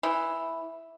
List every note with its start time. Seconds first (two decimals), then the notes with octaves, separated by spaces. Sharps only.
0.03 E3